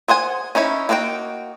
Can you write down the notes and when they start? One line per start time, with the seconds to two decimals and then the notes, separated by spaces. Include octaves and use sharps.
0.08 G#4 C5 F#5 G#5
0.55 C#4 D#4 E4 C#5
0.89 A#3 D#4 F#4 C#5 G5